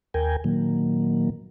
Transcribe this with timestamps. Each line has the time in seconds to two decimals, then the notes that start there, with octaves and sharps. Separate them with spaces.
0.14 D#2 A#4 G5 G#5
0.44 A#2 D#3 F#3 A#3